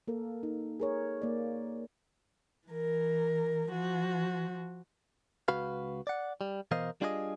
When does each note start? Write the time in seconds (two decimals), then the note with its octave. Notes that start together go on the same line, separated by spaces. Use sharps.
0.08 A#3 A4 A#4
0.43 D#4
0.80 G#4 A#4 C#5
1.22 A#3 D5
2.67 E3 A#4
3.70 F3 F#4
5.48 C#2 F#4 B4 F5
6.07 D5 F#5
6.41 G3
6.71 B2 E3 A#4 C5 D#5 F5
7.01 G3 D4 F4 G#4 B4 D#5